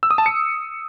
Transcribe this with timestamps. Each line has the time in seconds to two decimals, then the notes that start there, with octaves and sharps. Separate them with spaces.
0.03 E6
0.11 D#6
0.18 A5
0.26 C#7